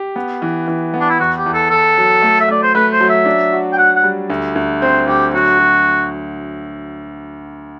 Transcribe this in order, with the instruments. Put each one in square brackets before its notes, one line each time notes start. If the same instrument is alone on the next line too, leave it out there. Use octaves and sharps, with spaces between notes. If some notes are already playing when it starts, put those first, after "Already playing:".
Already playing: [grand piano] G4
B3
E3
E3
B3
[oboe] D4
E4
[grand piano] E2 [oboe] F#4
[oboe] G4
[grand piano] E2
[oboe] A4
[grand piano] E2 [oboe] A4
[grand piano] F#3
A3
[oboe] E5
[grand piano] A3 [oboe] D5
[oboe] C5
[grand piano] A3 [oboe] B4
[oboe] C5
[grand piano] F#3
[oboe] E5
[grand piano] D4
F#4
[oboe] G5
[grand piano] F#4 [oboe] F#5
[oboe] F#5
[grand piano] G3
D2
D2
[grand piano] C4 [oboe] C5
[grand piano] D2 [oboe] G4
[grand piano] F#3 [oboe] F#4
[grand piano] F#3